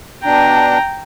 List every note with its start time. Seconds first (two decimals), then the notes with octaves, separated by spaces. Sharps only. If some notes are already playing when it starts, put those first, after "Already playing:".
0.25 B2 D4 G5 A#5